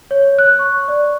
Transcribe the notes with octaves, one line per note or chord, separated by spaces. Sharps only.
C#5
F#6
C#6
D5